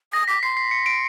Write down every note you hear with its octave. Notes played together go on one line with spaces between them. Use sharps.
D#6 A#6
D6 B6
C6 C7
C7
C#7
D7